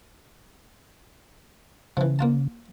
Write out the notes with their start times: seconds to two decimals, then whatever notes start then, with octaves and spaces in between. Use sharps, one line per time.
1.97 C#3 E3 F3
2.19 A#3 F4 A5